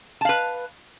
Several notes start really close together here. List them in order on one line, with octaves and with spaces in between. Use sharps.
A5 F5 B4